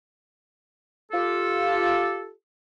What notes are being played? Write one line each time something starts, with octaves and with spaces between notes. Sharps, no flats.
F4 G4 A4